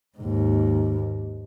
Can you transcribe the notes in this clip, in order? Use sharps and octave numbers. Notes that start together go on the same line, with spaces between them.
D#2 G#2